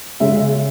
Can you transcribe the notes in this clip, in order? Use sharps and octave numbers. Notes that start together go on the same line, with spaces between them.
C#3 G#3 E5